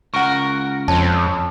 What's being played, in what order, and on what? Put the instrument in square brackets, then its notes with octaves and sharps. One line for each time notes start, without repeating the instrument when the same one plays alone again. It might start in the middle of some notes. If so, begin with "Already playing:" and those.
[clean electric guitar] C#2 A#4 [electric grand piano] F#5 C#6
[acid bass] F2 [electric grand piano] C4 C#5 [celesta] A5